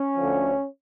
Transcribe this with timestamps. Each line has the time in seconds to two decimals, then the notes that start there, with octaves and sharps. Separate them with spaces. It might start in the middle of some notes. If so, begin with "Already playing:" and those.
Already playing: C#4
0.16 D2 D3 F3